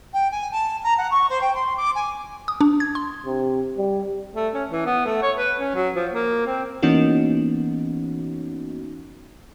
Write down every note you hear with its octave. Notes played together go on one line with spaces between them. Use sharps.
G5
G#5
A5
A#5
F#5
C#6
C5
G5
C6
D6
G#5
D#6
D4
G#6
C6
C3
G3
A3
C#4
E3
B3
A3
C#5
B4
C#4
F#3
F3
A#3
C4
E3 A#3 B3 C#4 D#4 F#4